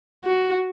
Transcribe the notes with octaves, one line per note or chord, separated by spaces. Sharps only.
F#4